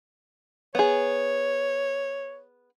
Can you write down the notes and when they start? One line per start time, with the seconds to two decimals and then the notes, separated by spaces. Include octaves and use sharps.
0.75 B3 G#4 C#5